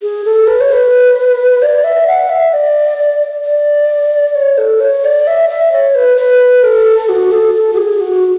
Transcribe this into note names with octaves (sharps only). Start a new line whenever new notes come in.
G#4
A4
B4
C#5
B4
D5
E5
F#5
E5
D5
D5
D5
C#5
A4
C#5
D5
E5
E5
C#5
B4
B4
A4
F#4
A4
A4
F#4
G#4
F#4